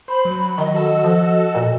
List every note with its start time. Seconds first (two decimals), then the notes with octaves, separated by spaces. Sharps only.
0.08 C5 B5
0.25 F#3
0.58 D#3 D#5
0.74 F#4 A4 E6
1.04 F3
1.55 A#2